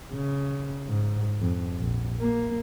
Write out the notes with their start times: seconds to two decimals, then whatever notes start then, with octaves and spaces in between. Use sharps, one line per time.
0.13 C#3
0.88 G#2
1.41 F2
1.77 A#1
2.21 A#3